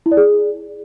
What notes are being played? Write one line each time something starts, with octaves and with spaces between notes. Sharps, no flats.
E4
D5
G#4